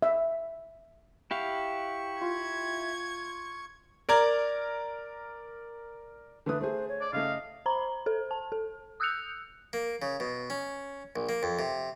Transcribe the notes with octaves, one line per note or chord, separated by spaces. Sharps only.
E5
E4 G4 F5 F#5 C#6
F4 G#6
A#4 D5 A#5 G#6
D3 A3 B4 D#6
A3 G#4 C5
C#5
D5
C#3 A3 D#5 F5
C5 A#5 B5
A4 C5
A5
A4
D#6 E6 F#6 G6 C#7 F7
A#3
C#3
B2
C#4
A#1
A#3
F2
C3